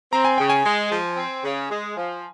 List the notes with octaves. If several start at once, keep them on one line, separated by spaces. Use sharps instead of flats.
C4 A#5
G#5
C#3 G5
G#5
G#3
F3
C4
C#3
G#3
F3